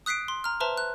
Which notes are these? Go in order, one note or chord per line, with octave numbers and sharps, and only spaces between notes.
D#6 F#6 B6 C7 D7
C6
A#5 F6
B4 C5 E5 A5 A#5 C6
F#6